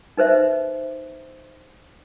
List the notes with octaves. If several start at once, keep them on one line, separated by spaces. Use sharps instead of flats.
D#4 B4 C5 E5